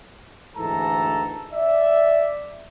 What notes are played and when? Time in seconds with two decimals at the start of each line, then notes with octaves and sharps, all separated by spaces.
0.57 D2 G#2 E3 A4 A5 A#5
1.54 D5 E5